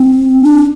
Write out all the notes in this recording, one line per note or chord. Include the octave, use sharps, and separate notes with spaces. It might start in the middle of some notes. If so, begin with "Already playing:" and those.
Already playing: C4
D4